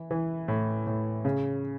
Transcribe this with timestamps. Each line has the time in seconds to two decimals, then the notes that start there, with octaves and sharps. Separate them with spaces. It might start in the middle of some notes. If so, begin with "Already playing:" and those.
Already playing: E3
0.11 E3
0.48 A2
0.87 A2
1.25 C#3